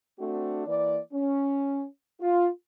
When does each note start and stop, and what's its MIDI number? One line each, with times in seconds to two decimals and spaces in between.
0.19 0.64 57
0.19 0.64 60
0.19 0.64 62
0.19 0.64 66
0.66 1.00 52
0.66 1.00 58
0.66 1.00 74
1.12 1.84 61
2.20 2.48 65